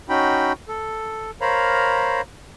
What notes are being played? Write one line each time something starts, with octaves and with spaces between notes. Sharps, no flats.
C#4 D#4 F#4 G5 B5
A4
A#4 C5 C#5 F5 A#5 B5